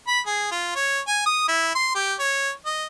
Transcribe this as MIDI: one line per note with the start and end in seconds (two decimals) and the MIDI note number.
0.08 0.20 83
0.27 0.49 68
0.51 0.75 65
0.76 1.00 73
1.08 1.21 80
1.26 1.44 87
1.49 1.71 64
1.75 1.91 84
1.95 2.14 67
2.19 2.51 73
2.66 2.86 75